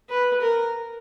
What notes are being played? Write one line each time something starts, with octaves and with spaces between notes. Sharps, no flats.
B4
A#4